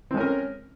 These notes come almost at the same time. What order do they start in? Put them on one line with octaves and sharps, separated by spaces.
C4 G#3 C#4 A#4